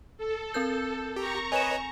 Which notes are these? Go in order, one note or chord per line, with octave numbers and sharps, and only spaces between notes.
A4
C4 A#4 G6
G4 A#5 C#6
B4 C#5 D#5 G#5 E7